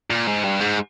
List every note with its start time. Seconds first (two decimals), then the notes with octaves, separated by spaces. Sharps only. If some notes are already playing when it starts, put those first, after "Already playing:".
0.10 A#2
0.27 G#2
0.43 G2
0.60 G#2